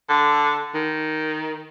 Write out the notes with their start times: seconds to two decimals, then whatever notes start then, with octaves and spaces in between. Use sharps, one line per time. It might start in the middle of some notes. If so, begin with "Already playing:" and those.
0.09 D3
0.74 D#3